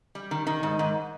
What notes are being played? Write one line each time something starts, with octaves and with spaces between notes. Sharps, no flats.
G3
D#3
D#3
G#2
G#2